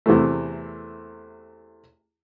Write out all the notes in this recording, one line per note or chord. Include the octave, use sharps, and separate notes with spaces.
E2 C3 E3 A3